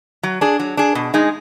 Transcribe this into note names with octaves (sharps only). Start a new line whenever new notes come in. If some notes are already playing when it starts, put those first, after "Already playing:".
F#3
D4 G#4
F#3
D4 G#4
B2
G#3 D#4 G#4